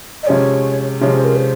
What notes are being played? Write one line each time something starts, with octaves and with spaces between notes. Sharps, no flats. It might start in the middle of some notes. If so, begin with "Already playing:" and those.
D#5
C3 F3 G#3 C#4 C#5
C3 F3 G#3 C#4 C#5
C5
A#4
C5